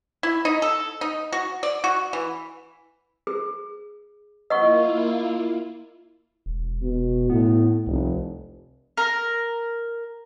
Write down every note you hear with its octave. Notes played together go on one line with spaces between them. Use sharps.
E4
D#4
A4
D#4
F#4
D5
F#4
E3
G#4
A#3 E4 F4 D#5 F#5 C#6
E1
B2
A2 B3
F1 C2
A#4